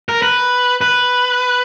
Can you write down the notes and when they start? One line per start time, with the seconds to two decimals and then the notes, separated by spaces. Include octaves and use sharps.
0.09 A#4
0.22 B4
0.81 B4